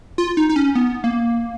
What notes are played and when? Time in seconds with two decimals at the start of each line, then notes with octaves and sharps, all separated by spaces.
0.18 F4
0.37 D#4
0.49 D#4
0.56 C#4
0.75 B3
1.04 A#3